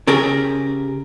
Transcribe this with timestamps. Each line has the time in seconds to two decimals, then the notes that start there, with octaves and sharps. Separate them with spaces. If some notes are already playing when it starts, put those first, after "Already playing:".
0.07 C#3 G4 G#4 A#4